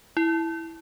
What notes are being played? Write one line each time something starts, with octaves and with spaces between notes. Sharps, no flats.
E4